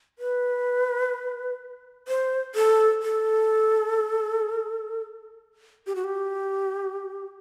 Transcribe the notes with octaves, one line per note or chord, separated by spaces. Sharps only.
B4
C5
A4
A4
G4
F#4
G4